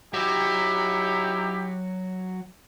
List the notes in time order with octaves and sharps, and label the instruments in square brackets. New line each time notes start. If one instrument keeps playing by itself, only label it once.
[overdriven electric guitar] F#3 [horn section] D#4 E4 G4